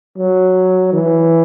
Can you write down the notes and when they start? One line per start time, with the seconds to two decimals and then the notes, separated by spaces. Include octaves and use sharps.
0.17 F#3
0.93 E3